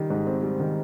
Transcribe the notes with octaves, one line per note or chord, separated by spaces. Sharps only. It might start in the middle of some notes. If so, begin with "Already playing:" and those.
Already playing: D#3 G3
G#2
C4
G3
D#3